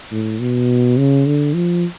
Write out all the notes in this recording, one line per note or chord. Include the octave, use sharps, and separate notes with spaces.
A2
B2
C#3
D3
F3